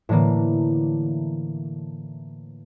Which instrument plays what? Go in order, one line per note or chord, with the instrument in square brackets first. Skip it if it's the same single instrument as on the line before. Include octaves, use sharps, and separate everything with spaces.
[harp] A2 D3 E3 A#3